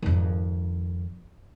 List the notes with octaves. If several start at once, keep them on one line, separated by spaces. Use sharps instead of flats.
G#1 F2